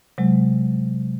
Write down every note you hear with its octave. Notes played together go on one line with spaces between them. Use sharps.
C3 F#3 G#3